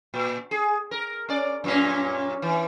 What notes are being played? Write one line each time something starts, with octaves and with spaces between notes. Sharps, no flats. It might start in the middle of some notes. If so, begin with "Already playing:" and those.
A#2
G#4
A#4
C#4 D5
F#2 A#2 C#4
E3